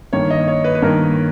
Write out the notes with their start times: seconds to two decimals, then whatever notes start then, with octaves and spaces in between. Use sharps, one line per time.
0.13 G2 D#3 A#3 C#5
0.30 D#5
0.48 C#5
0.64 B4
0.75 B4
0.82 G2 D#3 A#3 A#4